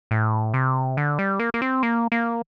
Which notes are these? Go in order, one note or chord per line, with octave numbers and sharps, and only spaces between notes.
A2
C3
D3
G3
A#3
A#3
C4
A#3
A#3